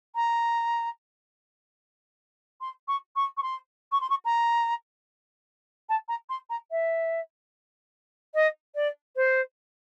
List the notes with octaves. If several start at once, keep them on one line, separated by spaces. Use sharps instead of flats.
A#5
C6
C#6
C#6
C#6
C6
C#6
C6
C#6
A#5
A5
A#5
C6
A#5
E5
D#5
D5
C5